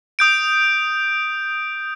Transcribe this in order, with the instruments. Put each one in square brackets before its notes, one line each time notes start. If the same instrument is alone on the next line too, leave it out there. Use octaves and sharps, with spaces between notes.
[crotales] D#6 G6 D7